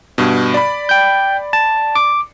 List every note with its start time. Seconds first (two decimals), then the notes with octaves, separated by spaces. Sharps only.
0.18 G2 B2
0.54 D5 B5
0.89 G5 G6
1.53 A5
1.95 D6